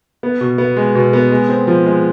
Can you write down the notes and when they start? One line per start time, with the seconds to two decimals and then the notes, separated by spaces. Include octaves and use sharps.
0.23 B3
0.41 B2
0.58 B3
0.77 G#3
0.95 B2
1.13 B3
1.31 G#3
1.49 C4
1.67 F3
1.86 G#3